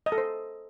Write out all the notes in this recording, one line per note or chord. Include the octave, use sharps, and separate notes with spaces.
D#5
A4
C5